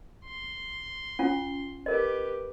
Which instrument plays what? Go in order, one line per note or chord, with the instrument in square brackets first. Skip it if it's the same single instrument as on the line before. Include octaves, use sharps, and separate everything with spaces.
[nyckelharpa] C6
[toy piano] C#4 F4 F#5
[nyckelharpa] G4 B4 [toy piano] A#4 D#5